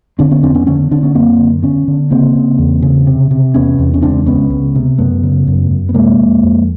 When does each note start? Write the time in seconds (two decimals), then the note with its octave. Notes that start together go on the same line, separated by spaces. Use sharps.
0.19 D3 C4 D4
0.31 B3 C#4
0.43 F2 C4 D4
0.55 B3 C#4
0.67 D3 B3 C#4
0.91 D3 C4 D4
1.03 B3 C#4
1.14 F#2 A#3 C4
1.39 D3
1.62 D3 B3 C#4
1.88 D3
2.11 C#3 A#3 C4
2.35 C#3
2.59 E2
2.82 C#3
3.07 C3
3.31 C3
3.54 E2 B3 C#4
3.79 E2
3.94 C#4
4.02 C#2 C4 D4
4.26 C#2 B3 C#4
4.50 C#2
4.75 C3
4.98 F#2 A3 B3
5.23 C#3
5.47 F#2
5.71 F#2
5.89 B3
5.94 C3 G#3 A#3
6.19 F2
6.43 F2